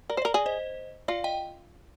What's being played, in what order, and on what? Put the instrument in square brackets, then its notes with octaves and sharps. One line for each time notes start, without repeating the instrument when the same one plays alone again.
[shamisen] A#4 [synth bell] D5
[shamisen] C5
[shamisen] A#4 [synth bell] D5
[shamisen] G#4 [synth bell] D5
[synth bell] C5 D#5
[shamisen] F4 [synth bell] D5 F5
[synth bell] D#5 G5